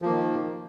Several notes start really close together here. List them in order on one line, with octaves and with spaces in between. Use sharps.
F3 A#3 D#3